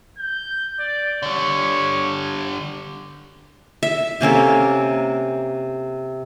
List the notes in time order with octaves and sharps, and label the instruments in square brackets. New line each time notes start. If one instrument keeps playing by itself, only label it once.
[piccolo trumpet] G6
D5
[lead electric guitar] D3 G3 [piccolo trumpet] C#5
[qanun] E5
C3 A#3 C#4 A4